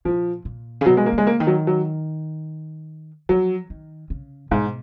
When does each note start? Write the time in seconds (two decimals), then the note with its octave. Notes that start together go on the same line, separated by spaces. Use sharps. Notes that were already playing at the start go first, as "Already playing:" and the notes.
0.05 A#2 F3
0.45 A#2
0.81 C#3
0.86 B2 F#3
0.97 G#3
1.06 A#3
1.13 C#3
1.18 G#3
1.27 A#3
1.40 D#3
1.47 F#3
1.67 F#3
3.29 F3 F#3
3.70 D#3
4.10 C#3
4.51 G#2 B2